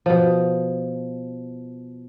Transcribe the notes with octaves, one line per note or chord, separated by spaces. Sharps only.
B2 F3